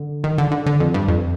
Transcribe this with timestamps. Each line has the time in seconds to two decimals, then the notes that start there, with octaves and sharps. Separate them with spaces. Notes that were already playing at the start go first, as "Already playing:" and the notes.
Already playing: D3
0.24 D#3
0.38 D3
0.51 D3
0.66 D3
0.80 F2
0.94 G2
1.08 F2